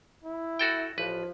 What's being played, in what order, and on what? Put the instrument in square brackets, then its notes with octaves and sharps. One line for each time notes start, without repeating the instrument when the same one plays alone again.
[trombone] E4
[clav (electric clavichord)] F#4 A4 G5
[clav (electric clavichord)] A1 B4 [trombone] F3